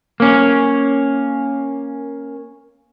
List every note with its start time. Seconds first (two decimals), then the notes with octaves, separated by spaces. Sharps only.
0.20 A#3 C#4